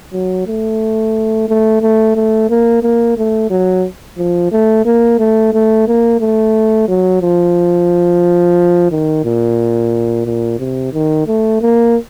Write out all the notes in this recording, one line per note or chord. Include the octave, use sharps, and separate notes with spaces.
F#3
A3
A3
A3
A3
A#3
A#3
A3
F#3
F3
A3
A#3
A3
A3
A#3
A3
F#3
F3
D#3
A#2
A#2
C3
D#3
A3
A#3